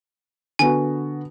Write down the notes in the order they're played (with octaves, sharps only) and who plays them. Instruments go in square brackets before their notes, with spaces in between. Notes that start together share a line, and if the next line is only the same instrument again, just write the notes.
[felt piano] D3 B3 F#4 [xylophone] G#5